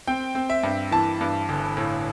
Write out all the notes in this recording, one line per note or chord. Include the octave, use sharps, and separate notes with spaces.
C4 G5
C4
E5
G2
E3 A5
G2
G1
A2